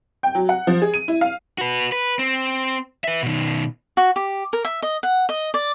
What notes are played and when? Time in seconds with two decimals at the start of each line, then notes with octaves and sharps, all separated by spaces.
0.23 G5
0.35 F#3
0.49 F#5
0.67 F3
0.82 G#4
0.94 D#7
1.08 E4
1.21 F5
1.58 F#4 B4
1.92 B4
2.19 C4
3.04 B4 E5
3.23 B2 D#3
3.97 F#4
4.16 G4
4.53 A#4
4.65 E5
4.83 D#5
5.03 F#5
5.29 D#5
5.54 D5